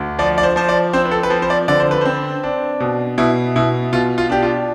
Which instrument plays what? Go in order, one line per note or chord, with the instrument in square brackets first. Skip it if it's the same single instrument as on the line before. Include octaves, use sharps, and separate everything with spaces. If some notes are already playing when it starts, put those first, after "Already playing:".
Already playing: [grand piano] D2
F3 D5
D5
C5
F3 C5
D5
C4 C5
B4
A4
B4
F3 C5
C5
D5
D3 D5
C5
B4
C4 C5
D4
B2
B2 E4
B2 E4
B2 F4
F4
D4 G4
F4